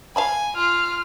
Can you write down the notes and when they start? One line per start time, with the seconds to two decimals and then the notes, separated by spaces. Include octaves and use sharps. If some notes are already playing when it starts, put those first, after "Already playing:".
0.16 F5 G#5 A5 B5
0.56 F4 F6